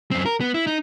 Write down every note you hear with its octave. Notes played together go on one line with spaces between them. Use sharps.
F#2 C4
A#4
B3
E4
D#4